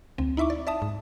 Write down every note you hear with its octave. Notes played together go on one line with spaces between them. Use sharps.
D2 C4
D#4 E4 E5 C#6 D6
D5
D5 E5 A5 D#6
G#2